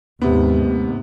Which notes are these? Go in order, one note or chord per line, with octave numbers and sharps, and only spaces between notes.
D#2 G#2 C3 B3